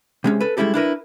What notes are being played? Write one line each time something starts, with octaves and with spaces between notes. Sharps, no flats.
C3 G#3 C#4
A4 B4
G3 G#3 C#4 E4 G4 A4
D4 E4 A#4 B4